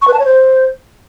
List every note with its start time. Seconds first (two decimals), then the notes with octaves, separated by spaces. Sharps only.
0.02 C#6
0.08 B4
0.13 A5
0.19 C#5
0.25 C5